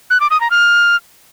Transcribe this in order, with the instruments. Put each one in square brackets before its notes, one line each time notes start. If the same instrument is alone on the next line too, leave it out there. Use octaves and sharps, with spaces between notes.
[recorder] F#6
D6
D#6
A#5
F6